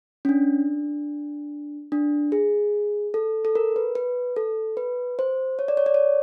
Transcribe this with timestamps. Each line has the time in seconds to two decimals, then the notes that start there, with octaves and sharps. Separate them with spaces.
0.25 C#4
0.29 D4
1.92 D4
2.32 G#4
3.14 A4
3.45 A4
3.55 A#4
3.76 B4
3.95 B4
4.36 A4
4.77 B4
5.19 C5
5.59 C#5
5.68 D5
5.77 C#5
5.86 D5
5.94 C#5